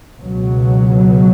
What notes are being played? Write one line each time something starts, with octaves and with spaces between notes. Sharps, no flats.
C#2 B2 F#3